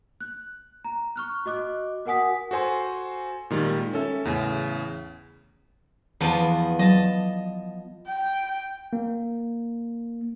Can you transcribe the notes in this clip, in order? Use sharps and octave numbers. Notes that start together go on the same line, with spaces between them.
F#6
A#5
C#6 F6 F#6
F#4 D#5 D6 F#6
F#4 A#4 F#5 G#5 D#6 B6
F#4 A4 C5 G#5 C6
A#2 D#3 G3 G#3
C#4 A4 E5
E2 A2 C#3
E2 F3 B3
F#3 D#5 A5
G5
A#3